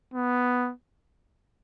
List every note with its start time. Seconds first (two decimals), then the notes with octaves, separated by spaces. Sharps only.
0.14 B3